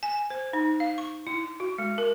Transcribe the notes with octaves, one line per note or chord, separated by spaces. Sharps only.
G#5
C5
D#4
F5
C#6
E4
F#4
G#3
A#4